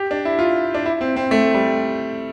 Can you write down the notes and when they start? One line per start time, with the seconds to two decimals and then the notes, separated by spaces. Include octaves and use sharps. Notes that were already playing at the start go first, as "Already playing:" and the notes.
Already playing: G4
0.11 D4
0.25 E4
0.39 F4
0.74 D4
0.86 E4
1.01 C4
1.16 C4
1.31 A3
1.54 G3